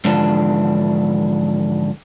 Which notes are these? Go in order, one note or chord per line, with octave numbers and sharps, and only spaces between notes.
G#2 D3 E3 F3 D4